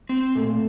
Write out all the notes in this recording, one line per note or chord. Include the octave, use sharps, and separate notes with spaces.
C4
A#2 A3